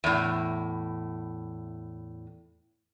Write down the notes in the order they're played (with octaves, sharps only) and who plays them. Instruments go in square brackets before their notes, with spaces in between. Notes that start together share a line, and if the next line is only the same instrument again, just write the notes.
[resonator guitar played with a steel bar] E2 A2